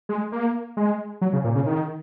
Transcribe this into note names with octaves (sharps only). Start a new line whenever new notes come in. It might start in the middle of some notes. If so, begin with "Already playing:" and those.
G#3
A#3
G#3
F#3
C#3
A#2
C#3
D#3